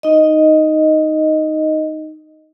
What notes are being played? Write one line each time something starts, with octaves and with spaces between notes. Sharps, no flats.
D#4 D#5